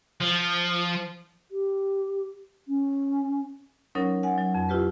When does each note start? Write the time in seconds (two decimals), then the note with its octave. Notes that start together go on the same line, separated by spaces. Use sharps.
0.21 F3
1.51 G4
2.68 C#4
3.95 F#3 C#4 D#4 A#4 C#5
4.23 F#5 G#5
4.38 F#3
4.55 F2
4.69 E4 F4 G4 B4